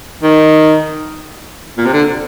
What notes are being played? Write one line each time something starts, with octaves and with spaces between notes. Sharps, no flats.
D#3
A#2
C3
D3